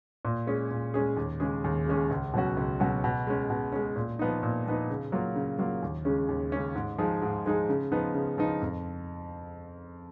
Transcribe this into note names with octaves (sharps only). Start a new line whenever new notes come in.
A#2
G#3 C#4 G#4
A#2
G#3 C#4 G#4
D#2
C#3 G#3 C#4 G#4
D#2
C#3 G#3 C#4 G#4
C#2
B2 F#3 C#4 F#4
C#2
B2 F#3 C#4 F#4
B2
G#3 C#4
B2
G#3 C#4
A#2
F3 B3 D#4
A#2
F3 B3 D#4
C#3
F#3 A#3 F4
C#3
F#3 A#3 F4
D#2
C#3 G#3 C#4
D#2
C#3 G#3 C#4
G#2
F3 G#3 D#4 G#4
G#2
F3 G#3 D#4 G#4
C#3
F3 B3 D#4
C#3
F3 B3 D#4
F2